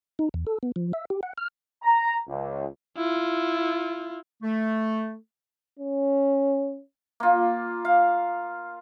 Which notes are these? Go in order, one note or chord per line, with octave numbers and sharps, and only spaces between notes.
D#4
E2
A4
B3
F3
E5
G4
F#5
F6
A#5
C#2
E4 F4
A3
C#4
A#3 F4
F5